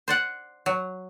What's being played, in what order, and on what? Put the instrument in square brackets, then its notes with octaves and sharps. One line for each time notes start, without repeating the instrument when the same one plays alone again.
[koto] C5 D5 F#5
F#3